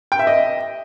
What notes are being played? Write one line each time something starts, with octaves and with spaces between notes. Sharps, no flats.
G5
E5
D#5